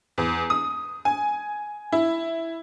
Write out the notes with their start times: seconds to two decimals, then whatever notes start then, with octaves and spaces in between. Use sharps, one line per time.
0.18 E2
0.50 D#6
1.05 G#5
1.92 E4